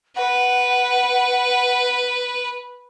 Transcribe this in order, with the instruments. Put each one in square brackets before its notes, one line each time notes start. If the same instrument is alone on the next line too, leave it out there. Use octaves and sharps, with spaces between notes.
[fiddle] B4 [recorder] F#5